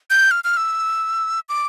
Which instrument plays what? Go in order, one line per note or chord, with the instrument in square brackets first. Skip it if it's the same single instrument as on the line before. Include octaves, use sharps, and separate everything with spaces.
[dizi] G6
F6
F6
E6
D6